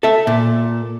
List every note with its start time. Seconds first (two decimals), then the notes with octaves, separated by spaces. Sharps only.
0.03 A4 E5
0.27 A#2